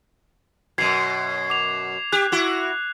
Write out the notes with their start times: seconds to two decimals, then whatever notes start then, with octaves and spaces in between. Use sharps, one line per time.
0.78 F#2 B2 G#6 C7
1.50 D6 F7
2.12 G4 F#6
2.32 E4 F#4